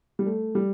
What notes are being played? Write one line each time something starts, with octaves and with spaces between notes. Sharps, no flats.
G3
A3
G3